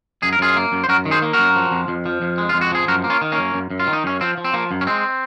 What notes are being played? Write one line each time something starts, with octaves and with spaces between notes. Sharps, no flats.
F#2 G#4
A#4
F#2 F4 G#4
A#3
F#2
C5
F#2 F#4 A#4
D#3
G#4 C5
A#3
F#4 A#4
F#2
F3
F2
F2
F3
F2
G#3
F4
F2
F#4
F3 G#4
F#2 F#4 A#4
A#3
C#4 F4
D#3
A#3 C#4
F#2
F#2
F#2
F4
D#3
D#4
F#2 C#4
F3 C4
F3
C4
F3 A#3
F#2
C#4
G#3 C4